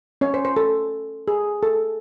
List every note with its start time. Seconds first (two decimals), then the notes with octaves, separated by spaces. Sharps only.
0.21 C#4 C#5
0.34 C5
0.45 C5
0.56 A4
1.28 G#4
1.63 A4